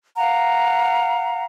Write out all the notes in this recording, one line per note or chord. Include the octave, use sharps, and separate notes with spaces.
F5 F#5 A#5